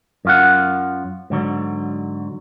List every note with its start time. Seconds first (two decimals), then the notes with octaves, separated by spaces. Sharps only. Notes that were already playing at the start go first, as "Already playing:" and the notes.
0.25 F#2 F4 F#5
1.30 G#2 D3 F#3